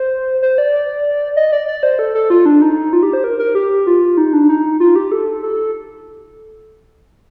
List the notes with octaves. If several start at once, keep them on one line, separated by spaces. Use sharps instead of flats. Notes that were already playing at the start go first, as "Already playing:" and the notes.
Already playing: C5
C5
D5
D#5
D5
D5
C5
A4
A4
F4
D4
D#4
F4
G4
C5
A#4
A#4
G4
F4
D#4
D4
D#4
F4
G4
A4
A4